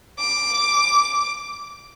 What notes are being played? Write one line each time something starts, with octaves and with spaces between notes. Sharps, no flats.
D6